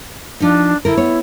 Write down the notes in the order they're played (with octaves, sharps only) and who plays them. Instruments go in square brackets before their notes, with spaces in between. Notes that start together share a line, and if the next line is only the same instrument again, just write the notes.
[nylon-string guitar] F3 D#4 [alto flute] D4
[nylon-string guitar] D3 A#4 [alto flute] E4
[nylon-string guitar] B3 C#5